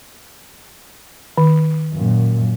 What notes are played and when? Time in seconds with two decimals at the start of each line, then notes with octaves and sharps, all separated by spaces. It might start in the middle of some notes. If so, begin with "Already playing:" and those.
1.38 D#3
1.94 F#2 A#2